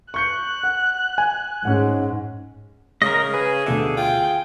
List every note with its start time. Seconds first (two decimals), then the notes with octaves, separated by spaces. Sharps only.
0.14 C#6 F#6 G6 C#7
0.63 F#5
1.18 G#5
1.65 G#2 G#3 C#4 F#5
3.02 C#3 G#3 A#4 D#5
3.34 G#4 B4
3.66 D2 B2 D3 E5
3.97 F4 G5